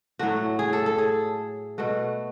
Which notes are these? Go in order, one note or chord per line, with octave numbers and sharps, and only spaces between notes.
A2 F#3 A3 F#4
G#4
A4
A4
G#4
B2 A3 F#4